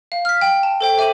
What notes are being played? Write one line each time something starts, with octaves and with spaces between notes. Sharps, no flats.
F5
F6 B6
G5
A5
A4 C5 G5
C5 E5 D6 D#7 F#7